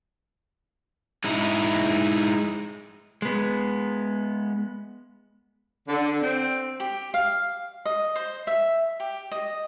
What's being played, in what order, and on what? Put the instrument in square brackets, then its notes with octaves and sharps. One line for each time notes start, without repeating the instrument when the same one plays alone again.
[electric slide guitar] G#3 D#4 E4
[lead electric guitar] G#3 B3
[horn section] D3
C4
[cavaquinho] G4
F5
D#5
C5
E5
G4
D#5